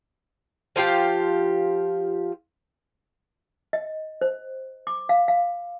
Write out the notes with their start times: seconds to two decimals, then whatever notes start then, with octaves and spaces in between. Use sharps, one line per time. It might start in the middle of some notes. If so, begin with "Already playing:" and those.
0.76 F3 F4 G4
3.73 D#5
4.21 C5
4.87 D6
5.09 F5
5.28 F5